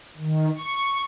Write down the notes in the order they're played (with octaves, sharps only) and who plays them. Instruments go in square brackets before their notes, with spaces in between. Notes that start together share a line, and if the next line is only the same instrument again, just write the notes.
[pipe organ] D#3
C#6